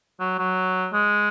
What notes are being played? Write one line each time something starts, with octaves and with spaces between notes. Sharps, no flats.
F#3
F#3
G#3